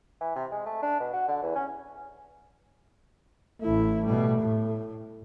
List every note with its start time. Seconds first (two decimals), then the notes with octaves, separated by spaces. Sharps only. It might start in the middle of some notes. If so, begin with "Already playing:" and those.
0.21 E3
0.36 C3
0.51 G#3
0.66 A3
0.82 D4
1.00 B2
1.13 F#4
1.28 D3
1.43 E2
1.55 C#4
3.61 A1 A3 E4
4.05 B2 G3
4.41 A2